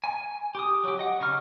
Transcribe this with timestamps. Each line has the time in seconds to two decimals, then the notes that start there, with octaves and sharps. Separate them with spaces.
0.04 G#5
0.55 G4 D#6
0.84 F#3 G4
0.99 D#5 F#5
1.20 C#3 D#4 G4 C#6 F6